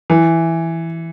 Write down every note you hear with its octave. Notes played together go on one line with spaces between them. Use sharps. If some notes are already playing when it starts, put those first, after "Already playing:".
E3